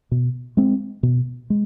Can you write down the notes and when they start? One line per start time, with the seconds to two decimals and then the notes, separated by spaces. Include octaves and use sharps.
0.11 B2
0.57 G#3 C4
1.03 B2
1.50 G#3